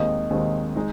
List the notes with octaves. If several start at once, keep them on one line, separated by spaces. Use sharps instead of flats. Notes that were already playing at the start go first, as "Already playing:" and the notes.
Already playing: D#2 D#3 G#3 C4 D#5
D#2 D#3 G#3 C4
G#3 D#4